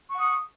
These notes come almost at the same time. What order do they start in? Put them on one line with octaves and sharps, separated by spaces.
C#6 F#5 D#6